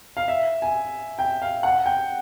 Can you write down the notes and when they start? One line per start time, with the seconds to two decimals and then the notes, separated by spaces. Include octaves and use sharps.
0.17 F5
0.28 E5
0.62 G#5
1.19 G5
1.42 F5
1.63 F#5
1.86 G5